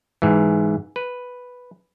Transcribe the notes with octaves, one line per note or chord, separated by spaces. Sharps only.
G#2 E3
B4